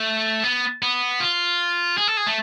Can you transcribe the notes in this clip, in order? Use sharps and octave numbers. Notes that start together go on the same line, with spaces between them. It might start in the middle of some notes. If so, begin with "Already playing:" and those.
Already playing: A3
B3
B3
F4
G#4
A4
G#4
A3